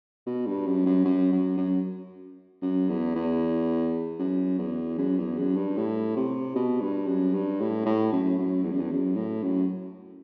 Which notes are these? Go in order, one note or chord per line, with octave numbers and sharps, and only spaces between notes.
B2
G2
F#2
F#2
F#2
F#2
F#2
F#2
E2
E2
F#2
E2
F#2
E2
F#2
G2
A2
C3
B2
G2
F#2
G2
A2
A2
F#2
F#2
E2
F#2
E2
F#2
A2
F#2